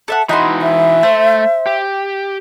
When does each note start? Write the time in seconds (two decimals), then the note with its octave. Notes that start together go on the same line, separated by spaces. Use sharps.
0.08 A4 E5 F#5
0.29 E3 D#4 E4 F#4 C6
0.62 E5
1.03 A3 C5
1.66 G4